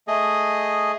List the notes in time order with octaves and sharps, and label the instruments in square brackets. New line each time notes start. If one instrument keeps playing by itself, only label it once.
[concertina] A3 G#4 D#5